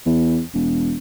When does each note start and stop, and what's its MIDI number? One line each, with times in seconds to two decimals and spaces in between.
0.06 0.42 40
0.54 0.98 28